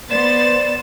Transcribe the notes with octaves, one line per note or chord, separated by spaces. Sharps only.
B3 C5 D5 A6 E7